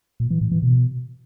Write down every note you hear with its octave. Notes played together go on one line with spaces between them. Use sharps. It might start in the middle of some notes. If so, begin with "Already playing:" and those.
A#2
E3
A2
E3
B2